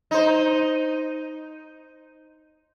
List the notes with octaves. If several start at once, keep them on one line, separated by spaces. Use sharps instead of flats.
D#4 C5